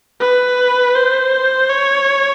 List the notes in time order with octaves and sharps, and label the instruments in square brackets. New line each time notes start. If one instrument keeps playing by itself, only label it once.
[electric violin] B4
C5
C#5